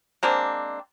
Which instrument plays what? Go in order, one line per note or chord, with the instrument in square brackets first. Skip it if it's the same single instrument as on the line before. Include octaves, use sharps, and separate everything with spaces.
[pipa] G#3 A#3 C4 D4